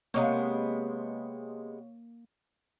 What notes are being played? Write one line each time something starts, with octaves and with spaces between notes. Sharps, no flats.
C3 G#3 A#3 B3 C#5 F5 C#6